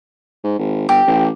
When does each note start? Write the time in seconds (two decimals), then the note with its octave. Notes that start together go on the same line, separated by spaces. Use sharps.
0.44 G#2
0.59 G#1
0.89 G1 G4
1.06 A1